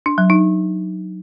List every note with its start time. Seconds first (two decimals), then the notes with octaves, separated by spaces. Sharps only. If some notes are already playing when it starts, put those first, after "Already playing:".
0.06 D4
0.18 F#3
0.30 D#4